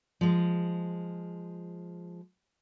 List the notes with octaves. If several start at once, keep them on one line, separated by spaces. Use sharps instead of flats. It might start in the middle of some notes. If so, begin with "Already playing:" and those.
F3 G#3